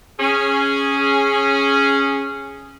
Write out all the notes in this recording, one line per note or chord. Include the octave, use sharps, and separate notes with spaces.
C#4 G#4